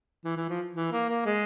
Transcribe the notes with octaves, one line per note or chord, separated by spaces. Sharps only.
E3
E3
F3
E3
A#3
A#3
G#3